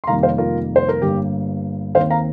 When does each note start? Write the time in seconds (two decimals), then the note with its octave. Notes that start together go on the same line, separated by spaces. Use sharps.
0.04 C6
0.07 F1 F2 D#3 G3 A#3 F5 A#5
0.23 C5 F5
0.38 F4 A#4
0.76 C5
0.89 A#4
1.02 G1 G2 G3 A#3 G4
1.95 D#2 D#3 C4 C5 F5
2.10 F5 A#5